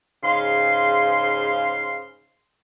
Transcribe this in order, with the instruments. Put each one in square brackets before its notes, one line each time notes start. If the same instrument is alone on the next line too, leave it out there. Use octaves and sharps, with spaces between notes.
[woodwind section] G#2 C#3 F5 C6